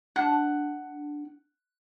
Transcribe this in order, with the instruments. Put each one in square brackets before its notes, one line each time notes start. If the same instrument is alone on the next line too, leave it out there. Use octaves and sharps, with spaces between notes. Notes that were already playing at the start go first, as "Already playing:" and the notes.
[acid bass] D4 [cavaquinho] F#5